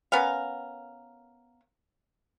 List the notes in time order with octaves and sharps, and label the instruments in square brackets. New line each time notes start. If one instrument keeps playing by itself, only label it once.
[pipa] B3 C#4 A#4 F5